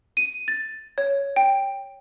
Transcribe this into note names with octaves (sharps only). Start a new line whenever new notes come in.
D#7
A6
C#5
G5